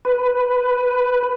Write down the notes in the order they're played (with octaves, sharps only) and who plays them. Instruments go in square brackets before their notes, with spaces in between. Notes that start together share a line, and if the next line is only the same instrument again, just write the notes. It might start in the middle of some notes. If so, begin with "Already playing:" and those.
[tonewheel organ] B4